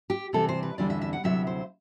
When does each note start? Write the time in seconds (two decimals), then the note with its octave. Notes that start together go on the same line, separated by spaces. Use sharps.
0.10 G4
0.33 C3 E3 G3 C4 A4
0.49 C5
0.63 B4
0.78 E2 D3 G3 C4 E4 D5
0.90 E5
1.01 E5
1.13 F#5
1.24 D2 C3 F#3 C4 E4 E5
1.47 C5